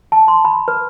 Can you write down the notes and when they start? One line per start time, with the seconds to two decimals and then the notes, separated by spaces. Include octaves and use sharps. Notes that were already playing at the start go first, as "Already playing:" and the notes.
0.12 A5
0.28 C6
0.45 B5
0.68 B4